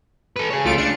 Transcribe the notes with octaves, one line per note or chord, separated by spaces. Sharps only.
A4 B4
G#4 C#5
C#2 A3 F4 D7
D4 C#7